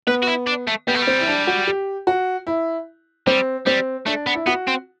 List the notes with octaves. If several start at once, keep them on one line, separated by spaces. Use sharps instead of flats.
B3 B4
F#4
E4
D4
A3
G3 B3
A3
G3
C4
E4
D4
F#4
G4
F#4
E4
G3 C4
G3 C4
A3 D4
B3
E4
B3 F#4
C4